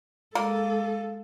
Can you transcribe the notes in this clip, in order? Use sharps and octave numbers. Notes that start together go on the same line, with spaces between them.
G#3 A#3 A4